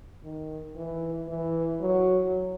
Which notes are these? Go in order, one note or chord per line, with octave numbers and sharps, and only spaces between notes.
D#3
E3
E3
F#3